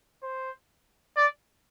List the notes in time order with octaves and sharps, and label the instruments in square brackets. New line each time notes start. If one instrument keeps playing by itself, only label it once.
[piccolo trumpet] C5
D5